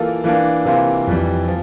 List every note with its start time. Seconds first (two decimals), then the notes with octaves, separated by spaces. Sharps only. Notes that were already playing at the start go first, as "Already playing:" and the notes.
Already playing: E3 A#3 F4 A4
0.24 E3 A#3 D4
0.65 C3 E3 A#3 F4 C5
1.07 F2 E3 G3
1.48 F3